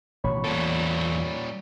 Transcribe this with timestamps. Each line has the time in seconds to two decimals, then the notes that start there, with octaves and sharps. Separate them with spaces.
0.24 A1 B2 D#3 C#5 B5 C#6
0.45 E2 A#2 G3 A#3 A4